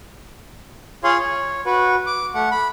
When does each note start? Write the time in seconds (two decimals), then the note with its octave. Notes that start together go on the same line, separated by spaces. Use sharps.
1.04 F4 G#4 C#5 F5 C6
1.20 C#5
1.66 F#4 B4
2.06 D6
2.34 A3 F#5
2.51 B5